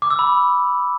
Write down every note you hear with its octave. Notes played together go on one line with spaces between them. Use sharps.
D6
E6
B5